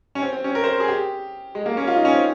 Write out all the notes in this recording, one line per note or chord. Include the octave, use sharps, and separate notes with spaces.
C#4
C4
C4
C#4
A#4
C5
G#4
G4
G#3
A#3
C#4
F4
D#4
C#4
C4